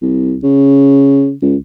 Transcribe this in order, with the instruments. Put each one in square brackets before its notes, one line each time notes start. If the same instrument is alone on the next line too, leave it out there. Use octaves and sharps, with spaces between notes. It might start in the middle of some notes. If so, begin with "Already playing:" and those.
[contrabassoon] C2
C#3
C#2